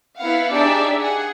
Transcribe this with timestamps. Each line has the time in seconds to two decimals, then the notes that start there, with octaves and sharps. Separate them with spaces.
0.18 B3 E4 F5 F#5
0.51 D4 D#4 G4 G#4 D5 E5
0.98 G#4 F#5